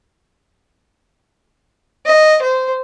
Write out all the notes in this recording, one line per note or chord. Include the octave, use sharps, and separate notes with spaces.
D#5
C5